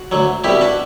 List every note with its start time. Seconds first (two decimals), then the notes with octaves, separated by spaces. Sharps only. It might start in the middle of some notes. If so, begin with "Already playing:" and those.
Already playing: F#4
0.12 D2 D3 F#3
0.44 C2 B2 G3 E4 G4
0.61 D4 F#4